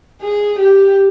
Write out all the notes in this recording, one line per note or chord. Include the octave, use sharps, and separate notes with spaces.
G#4
G4